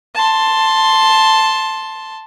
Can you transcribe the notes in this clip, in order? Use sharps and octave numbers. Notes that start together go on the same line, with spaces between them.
A5 C6